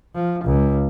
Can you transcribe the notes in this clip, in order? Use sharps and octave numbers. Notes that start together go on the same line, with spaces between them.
F3
C#2